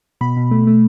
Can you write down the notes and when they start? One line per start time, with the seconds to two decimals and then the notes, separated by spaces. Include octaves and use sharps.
0.21 B2 B5
0.37 B2
0.51 A3
0.67 A3